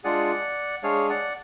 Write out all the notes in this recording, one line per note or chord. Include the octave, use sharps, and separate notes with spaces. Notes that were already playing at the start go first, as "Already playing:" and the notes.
G#3 D4 F4 G#4 D5 F#5
G#3 D4 G#4 C#5 F5
D5 F#5